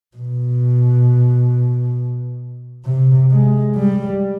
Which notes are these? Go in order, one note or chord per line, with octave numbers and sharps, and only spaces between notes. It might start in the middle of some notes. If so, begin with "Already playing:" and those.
B2
C3
G#3
G3